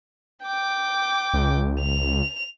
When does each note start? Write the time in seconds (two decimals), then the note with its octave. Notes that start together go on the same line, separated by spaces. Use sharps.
0.44 G5 D6
1.34 C#2
1.80 F7